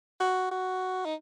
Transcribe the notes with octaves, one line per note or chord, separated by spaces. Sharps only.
F#4
F#4
D#4